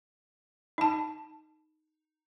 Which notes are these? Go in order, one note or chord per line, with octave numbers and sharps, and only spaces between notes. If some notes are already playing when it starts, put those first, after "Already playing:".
D#4 A5